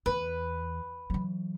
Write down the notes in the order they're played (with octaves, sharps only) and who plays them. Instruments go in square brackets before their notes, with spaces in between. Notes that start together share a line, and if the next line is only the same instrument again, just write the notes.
[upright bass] E2 [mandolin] B4
[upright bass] E3 F#3